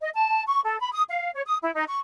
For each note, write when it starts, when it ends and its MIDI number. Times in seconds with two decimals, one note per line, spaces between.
0.01 0.09 75
0.13 0.43 81
0.47 0.61 85
0.63 0.79 69
0.81 0.92 83
0.93 1.03 87
1.09 1.32 77
1.34 1.41 73
1.46 1.56 87
1.62 1.73 64
1.75 1.85 63
1.89 1.99 85